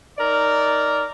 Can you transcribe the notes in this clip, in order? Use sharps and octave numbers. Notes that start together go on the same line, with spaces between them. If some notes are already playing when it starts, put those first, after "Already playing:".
D#4 A#4 D5